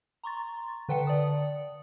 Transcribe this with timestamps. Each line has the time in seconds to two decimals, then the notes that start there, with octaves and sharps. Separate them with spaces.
0.24 A#5 C6 C#6 A6
0.89 D3 B4 G5 A5 C#7
1.07 D5 D#6